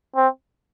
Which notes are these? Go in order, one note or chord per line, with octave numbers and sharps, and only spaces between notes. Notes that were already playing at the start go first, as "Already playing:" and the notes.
C4